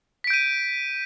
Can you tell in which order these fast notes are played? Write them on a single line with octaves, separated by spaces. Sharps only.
B6 D7 G6 D#7